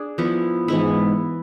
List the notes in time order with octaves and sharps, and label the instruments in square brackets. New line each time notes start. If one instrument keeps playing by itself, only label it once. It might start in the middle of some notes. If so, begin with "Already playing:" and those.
Already playing: [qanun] D4 G#4
F3 B3 E4
[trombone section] G#2 [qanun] E3 B3 E4